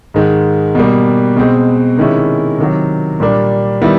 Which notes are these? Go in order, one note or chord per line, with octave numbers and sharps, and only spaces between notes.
G#2 D#3 G#3
B2 G3 A#3
B2 G#3 C4
C3 D#3 G#3 C#4 E4
C3 D#3 F#3
A#2 G3 A#3 D4
D#3 G3 B3 E4